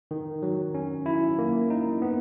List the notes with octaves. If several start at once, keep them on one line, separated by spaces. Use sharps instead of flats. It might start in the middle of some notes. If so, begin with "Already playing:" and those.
D#3
F#3
C#4
E4
A#3
D#4
B3